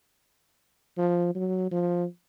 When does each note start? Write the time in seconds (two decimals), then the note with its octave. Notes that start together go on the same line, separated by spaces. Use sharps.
0.98 F3
1.35 F#3
1.71 F3